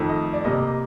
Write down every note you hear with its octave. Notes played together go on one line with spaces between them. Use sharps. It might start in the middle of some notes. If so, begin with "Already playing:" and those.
Already playing: F2 D#3 A3
D#5
D5
C3 G3 A#3 D#5